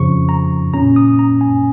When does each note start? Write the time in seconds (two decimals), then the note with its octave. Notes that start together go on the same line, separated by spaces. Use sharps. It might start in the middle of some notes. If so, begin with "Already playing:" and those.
Already playing: F2 C#3 F3 C#6
0.29 A#5
0.74 A#2 A#3 C#4 A#5
0.96 D#6
1.19 A#5
1.41 G#5